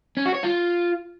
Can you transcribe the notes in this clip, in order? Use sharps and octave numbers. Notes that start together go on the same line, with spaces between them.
C#4
F#4
C#5
F4